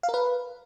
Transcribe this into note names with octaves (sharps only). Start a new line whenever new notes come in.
F5
A#4
B4